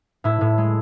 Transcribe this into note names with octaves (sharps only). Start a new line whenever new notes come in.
A2 E4
A2
G#3